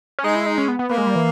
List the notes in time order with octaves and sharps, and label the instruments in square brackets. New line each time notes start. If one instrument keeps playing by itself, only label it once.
[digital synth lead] C#4
[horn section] G#3 [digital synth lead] D#4
[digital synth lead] E4
D#4
C#4
B3
B3
[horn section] A#3 [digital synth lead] B3
[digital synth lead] G#3
G3
E3